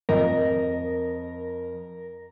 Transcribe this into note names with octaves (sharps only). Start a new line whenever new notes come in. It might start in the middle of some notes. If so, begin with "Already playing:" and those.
F2 A#4 D#5